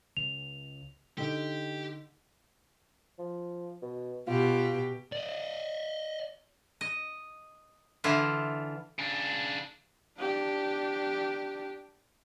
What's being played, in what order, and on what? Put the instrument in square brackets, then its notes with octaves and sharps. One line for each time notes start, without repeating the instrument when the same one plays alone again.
[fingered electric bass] C#2 [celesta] F7
[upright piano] D3 D#4 [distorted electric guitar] G4
[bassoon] F3
B2
[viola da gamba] B2 G4 [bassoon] F4
[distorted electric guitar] D5 D#5
[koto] D#5
D3 E3 E4 F4
[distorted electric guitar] C#3 D4
[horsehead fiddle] D4 G4